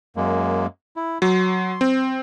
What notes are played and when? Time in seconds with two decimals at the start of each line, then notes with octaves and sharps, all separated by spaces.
0.16 F#2 G#3 A#3
0.96 E4
1.22 F#3 C6
1.81 C4